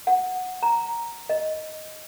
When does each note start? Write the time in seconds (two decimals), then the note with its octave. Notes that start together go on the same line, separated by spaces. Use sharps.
0.07 F#5
0.63 A#5
1.30 D#5